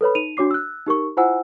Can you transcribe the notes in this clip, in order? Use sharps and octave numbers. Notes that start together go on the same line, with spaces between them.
A4 B4 C#5 B5
D#4 D#7 F7
D4 F#4 C#5 D6 C7
E6 F#6
D#4 G4 A#4 C#6
E4 F4 C5 F#5 G#5 E6